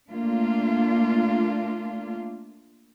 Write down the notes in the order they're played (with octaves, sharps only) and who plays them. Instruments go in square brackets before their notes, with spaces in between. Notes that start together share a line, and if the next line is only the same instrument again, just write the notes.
[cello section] A3 A#3 D4 F4